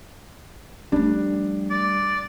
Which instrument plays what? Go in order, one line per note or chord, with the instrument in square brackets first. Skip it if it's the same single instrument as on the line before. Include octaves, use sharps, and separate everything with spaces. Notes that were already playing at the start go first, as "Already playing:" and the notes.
[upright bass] F3 A3 [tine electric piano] G3 [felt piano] D4
[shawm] D5